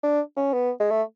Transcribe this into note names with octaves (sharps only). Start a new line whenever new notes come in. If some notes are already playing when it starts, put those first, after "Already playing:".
D4
C#4
B3
G#3
A3